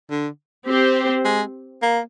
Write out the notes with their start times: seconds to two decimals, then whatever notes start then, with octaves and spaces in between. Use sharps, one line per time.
0.11 D3
0.68 C4 G4 C5
1.25 G#3
1.82 A#3